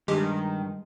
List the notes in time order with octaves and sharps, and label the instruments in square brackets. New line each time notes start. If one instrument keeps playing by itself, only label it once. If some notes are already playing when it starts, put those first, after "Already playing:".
[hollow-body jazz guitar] G2 [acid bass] D#3 [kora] G#3 [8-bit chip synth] G4